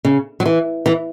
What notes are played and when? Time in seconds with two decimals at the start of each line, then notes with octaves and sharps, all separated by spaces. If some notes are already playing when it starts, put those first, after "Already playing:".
0.05 C#3
0.40 F#3
0.46 E3
0.86 E3